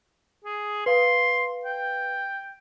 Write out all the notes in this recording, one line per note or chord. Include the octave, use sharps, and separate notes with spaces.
G#4
B4 F5 C6
G5